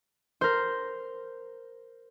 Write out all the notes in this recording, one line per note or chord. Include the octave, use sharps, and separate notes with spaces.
A#4 C5